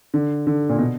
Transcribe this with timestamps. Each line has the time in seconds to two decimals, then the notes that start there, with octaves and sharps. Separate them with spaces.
0.14 D3
0.47 D3
0.69 A#2
0.78 B2